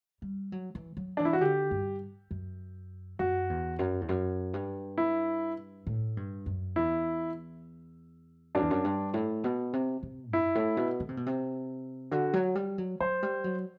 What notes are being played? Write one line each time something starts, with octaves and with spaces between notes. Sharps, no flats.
G3
F#3
E3
F#3
E3 D4
E4
F#4
D3 G4
G2
F#2
F#2 F#4
E2
F#2
E2
F#2
G2
E4
A2
G2
F#2
E2 E4
F#2 D4
E2
F#2
G2
A2
B2
C3
C3
F#2 E4
A2
B2
D3
C3
B2
C3
D3 F#4
F#3
G3
F#3
F#3 C5
G3
F#3